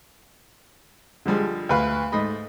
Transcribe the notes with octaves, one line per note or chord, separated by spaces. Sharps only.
D3 F3 G3 G#3
D2 B4 F5
G#2 A3 D#5 B5